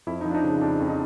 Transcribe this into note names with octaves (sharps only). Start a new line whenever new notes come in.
F2 E4
F3 D#4
D4
D#4
C#3
F2 D4
F2
D#4